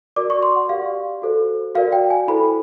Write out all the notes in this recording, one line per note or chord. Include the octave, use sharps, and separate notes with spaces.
F#4 A#4 D5 D6
C#6
C6
F#5
G4 A#4 D5 F5
F#4 A4 C5
F#4 A#4 D5 F5
G5
G#5
E4 A4 C5 B5